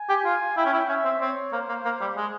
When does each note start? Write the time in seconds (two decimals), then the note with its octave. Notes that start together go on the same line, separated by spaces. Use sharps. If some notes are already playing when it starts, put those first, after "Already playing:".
Already playing: G#5
0.09 G4
0.25 F4
0.57 E4 G5
0.66 C#4
0.73 E4
0.89 C#4 E5
1.05 C4
1.21 C4 C#5
1.52 A#3 C5
1.69 A#3
1.85 A#3
2.01 G3
2.17 G#3